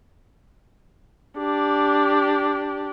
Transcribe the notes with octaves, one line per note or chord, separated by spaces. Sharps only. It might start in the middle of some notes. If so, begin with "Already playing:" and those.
D4 G4